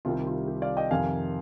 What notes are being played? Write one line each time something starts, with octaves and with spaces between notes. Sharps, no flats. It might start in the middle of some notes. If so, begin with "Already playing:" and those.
C2 C3 D#3 G3 C4 F4
F4
G4
D5 F5
D#5 G5
F2 C3 D#3 F5 G#5